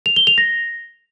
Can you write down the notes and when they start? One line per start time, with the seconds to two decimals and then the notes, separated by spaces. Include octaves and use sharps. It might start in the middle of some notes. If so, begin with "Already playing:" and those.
0.06 F7
0.16 G7
0.27 F7
0.38 A#6